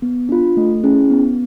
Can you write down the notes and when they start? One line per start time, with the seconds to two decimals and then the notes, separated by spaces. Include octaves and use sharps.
0.02 B3
0.29 D4 F4
0.57 A3
0.83 C#4 E4 G#4
1.10 B3